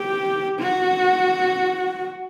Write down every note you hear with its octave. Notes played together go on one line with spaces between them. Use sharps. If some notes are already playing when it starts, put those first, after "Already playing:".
Already playing: G4
F#4